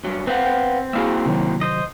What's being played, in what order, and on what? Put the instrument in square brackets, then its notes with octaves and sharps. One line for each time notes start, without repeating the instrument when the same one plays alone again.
[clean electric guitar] G2 F#3
[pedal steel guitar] C4 [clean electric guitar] B4 F5 F#5
[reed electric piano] G5
[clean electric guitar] A#3 E4 F#4 [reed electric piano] G#4 F5 E6
[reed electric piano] C3 D#3 F#3
[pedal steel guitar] C5 D#5